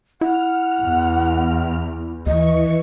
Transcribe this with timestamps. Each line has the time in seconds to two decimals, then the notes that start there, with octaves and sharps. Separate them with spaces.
0.21 E4 F#5 F6
0.80 E2
2.26 D#2 E3 D#5 C#6